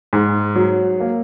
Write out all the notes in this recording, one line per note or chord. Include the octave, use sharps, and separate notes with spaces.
G#2
F#3
A#3